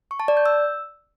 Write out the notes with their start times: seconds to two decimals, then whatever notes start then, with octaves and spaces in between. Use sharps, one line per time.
0.11 C#6
0.20 A5
0.28 D5
0.37 G6
0.46 E6